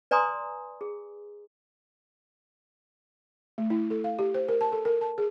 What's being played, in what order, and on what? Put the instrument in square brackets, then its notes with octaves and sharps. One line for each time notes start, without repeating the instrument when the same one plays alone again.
[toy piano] B4 D5 G#5 A#5 C6 D#6
G#4
[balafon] A3
E4
A4
F5
G4
C5
A#4
A5
A4
A#4
A5
G#4